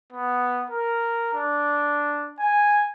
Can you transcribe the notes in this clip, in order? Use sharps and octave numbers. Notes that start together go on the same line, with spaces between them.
B3
A#4
D4
G#5